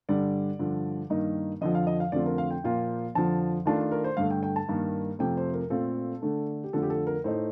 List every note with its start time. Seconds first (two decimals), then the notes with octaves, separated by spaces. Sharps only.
0.09 G2 D3 G3 D5
0.59 G2 D3 F3
1.10 G2 D#3 A#3 D#4
1.61 F2 D3 F3 D#5
1.75 F5
1.87 D#5
2.00 F5
2.12 F2 D3 A3 C4 F4 D5
2.26 A#4
2.38 F5
2.51 G5
2.64 A#2 F3 A#3 F4
3.15 F2 D3 F3 A5
3.66 D#3 A3 D4 F4 A5
3.92 A#4
4.04 C5
4.17 G2 D3 A3 F5
4.31 G5
4.43 G5
4.56 A5
4.68 G2 D#3 A#3
5.19 F2 C3 F3 A3 G5
5.37 C5
5.54 A#4
5.70 A#2 A3 C4 F4 A4
6.22 D3 A3 D4
6.64 G4
6.73 F2 D3 F3 A3 A4
6.83 G4
6.90 A4
7.07 A#4
7.24 A2 A3 D#4 C5